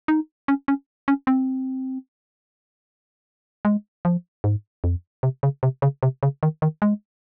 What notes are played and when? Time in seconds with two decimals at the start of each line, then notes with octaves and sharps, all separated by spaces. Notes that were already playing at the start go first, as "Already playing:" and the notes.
0.08 D#4
0.48 C#4
0.68 C#4
1.08 C#4
1.27 C4
3.65 G#3
4.05 F3
4.44 G#2
4.84 F2
5.23 C3
5.43 C#3
5.63 C3
5.82 C#3
6.03 C3
6.23 C#3
6.43 D#3
6.62 D#3
6.82 G#3